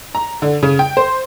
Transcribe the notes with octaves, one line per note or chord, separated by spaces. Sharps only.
A#5
D3
C#3
G5
C5